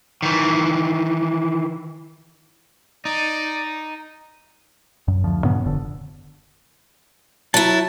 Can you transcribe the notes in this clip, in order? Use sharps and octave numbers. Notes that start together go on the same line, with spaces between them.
D#3 E3
D#4 D5
F#2
D2 F3
G2 A#2 C#3 B3
F1 D3
F#3 E4 A5